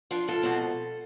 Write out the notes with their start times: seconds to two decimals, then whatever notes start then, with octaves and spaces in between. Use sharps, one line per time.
0.11 F3 D4 F4
0.28 G#2 F4 A4
0.43 B2 C4